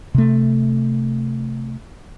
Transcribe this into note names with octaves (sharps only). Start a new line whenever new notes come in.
C3 A3